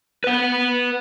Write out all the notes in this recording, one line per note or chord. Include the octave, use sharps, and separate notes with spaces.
B4 F#5